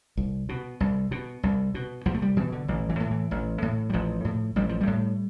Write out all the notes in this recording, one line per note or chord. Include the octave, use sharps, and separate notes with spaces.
C2
B2
C2
B2
C2
B2
C2 F3
A3
G3
B2 E3
D3
A1 E3
E3
A2
E3
A1
A2
G3
A1 F3
A2
A1 G3
F3
G3
A2